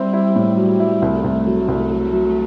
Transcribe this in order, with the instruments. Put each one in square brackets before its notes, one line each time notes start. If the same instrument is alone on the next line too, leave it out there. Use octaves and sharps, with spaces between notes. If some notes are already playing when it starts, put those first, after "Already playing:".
Already playing: [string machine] G3 [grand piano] C4 E4
[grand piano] E4
A2
F#3
E4
[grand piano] C2 [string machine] A3
[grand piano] C2
F#3
C2
F#3
F#3